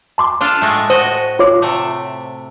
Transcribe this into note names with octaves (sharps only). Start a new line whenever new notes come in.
A5 C6 D6
D4 F4 A4
A2 G#3 A3
F#4 C5 D#5
F4 C#5 D6
C3 A3